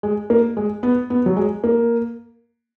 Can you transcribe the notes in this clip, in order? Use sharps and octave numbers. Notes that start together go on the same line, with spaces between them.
G#3
A#3
G#3
B3
B3
F#3
G#3
A#3